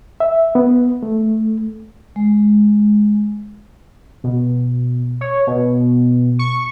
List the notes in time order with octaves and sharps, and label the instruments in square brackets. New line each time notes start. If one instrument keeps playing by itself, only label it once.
[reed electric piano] E5
B3
A3
[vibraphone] G#3
[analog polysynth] B2
C#5
B2
C#6